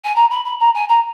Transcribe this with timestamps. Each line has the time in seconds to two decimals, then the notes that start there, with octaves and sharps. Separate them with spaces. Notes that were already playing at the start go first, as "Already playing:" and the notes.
0.04 G#5
0.15 A#5
0.30 B5
0.45 B5
0.60 A#5
0.74 G#5
0.89 A#5